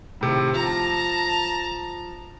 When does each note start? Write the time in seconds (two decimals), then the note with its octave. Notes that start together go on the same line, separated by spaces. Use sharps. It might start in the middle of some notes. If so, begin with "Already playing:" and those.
0.21 A2 C3 D#3
0.54 F3 A5 A#5